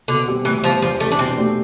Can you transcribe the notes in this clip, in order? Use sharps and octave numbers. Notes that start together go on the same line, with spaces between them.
B2 D3
G3 C4 G4
A2 E3
F3 G3 B3
E2 F3
C3 E3 A3
D4
B2 C4
A3 D4 G4